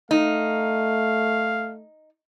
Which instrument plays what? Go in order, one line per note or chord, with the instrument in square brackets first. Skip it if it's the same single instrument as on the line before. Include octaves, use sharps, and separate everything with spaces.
[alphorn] A3 [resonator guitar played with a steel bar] D#4 [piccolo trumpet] F5